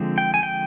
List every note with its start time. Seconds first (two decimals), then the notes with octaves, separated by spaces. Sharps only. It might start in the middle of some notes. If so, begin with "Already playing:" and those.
Already playing: D3 F3 G#3 C4
0.18 G5
0.34 G#5
0.43 G5